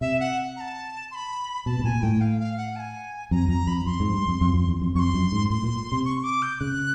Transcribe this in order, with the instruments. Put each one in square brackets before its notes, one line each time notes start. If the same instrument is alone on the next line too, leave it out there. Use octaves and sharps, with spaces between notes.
[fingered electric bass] C3 [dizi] E5
[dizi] F#5
A#5
A5
C6
B5
[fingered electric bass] B2 [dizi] A5
[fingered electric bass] B2
[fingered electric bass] A#2 [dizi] G#5
[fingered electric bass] A2 [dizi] G5
[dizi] F5
F5
F#5
A5
G#5
[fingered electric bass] F2 [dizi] A#5
[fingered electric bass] F2 [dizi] A#5
[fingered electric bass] F2 [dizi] B5
[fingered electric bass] F2 [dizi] C6
[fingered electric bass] G#2
G2
F2
F2
F2
E2
F2
[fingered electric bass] F2 [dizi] C#6
[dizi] C6
[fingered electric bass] F#2
G#2
[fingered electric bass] A2 [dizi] C6
[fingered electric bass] A#2
C3
[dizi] C#6
D6
G6
[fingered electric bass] C#3 [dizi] F#6